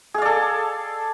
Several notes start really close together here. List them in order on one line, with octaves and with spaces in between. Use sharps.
G#4 F5 D5 A4